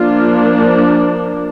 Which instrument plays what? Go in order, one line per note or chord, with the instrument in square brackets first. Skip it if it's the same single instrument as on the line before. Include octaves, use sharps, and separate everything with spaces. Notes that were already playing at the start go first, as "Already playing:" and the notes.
Already playing: [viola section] F3 A#3 D4 F4